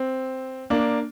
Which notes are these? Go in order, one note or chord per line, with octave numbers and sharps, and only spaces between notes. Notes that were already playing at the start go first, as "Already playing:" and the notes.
Already playing: C4
A#3 D4